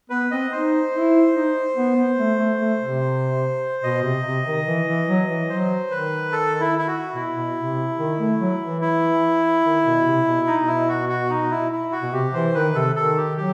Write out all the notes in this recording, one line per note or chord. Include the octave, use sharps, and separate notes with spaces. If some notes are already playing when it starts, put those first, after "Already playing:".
B3 B4
C4 D#5
D#4 C5
E4
D#4
B3
B3
A3
A3
A3
C3
B2 D#5
C3
C3
D#3
E3
E3
F#3
E3
F#3 C5
D#3 B4
A4
E4
E4
F#4
B2 E4
B2
C3
D#3
A3
F#3
E3
E4
D#3
B2
C3
B2
D#4
B2
E4
F#4
F#4
D#4
E4
E4
F#4
B2
C3 G4
E3 C5
D#3 B4
C3 A4
D#3 A4
G4
F#3 G4